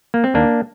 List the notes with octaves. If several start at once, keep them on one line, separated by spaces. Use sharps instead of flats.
A#3
C4
D#2 A#3 D4